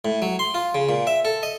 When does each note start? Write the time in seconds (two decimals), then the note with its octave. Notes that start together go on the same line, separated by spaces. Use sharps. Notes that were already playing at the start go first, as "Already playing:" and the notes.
0.05 A2
0.22 F#3
0.39 C6
0.54 F4
0.75 C#3
0.89 A#2
1.07 E5
1.25 A4
1.43 D#5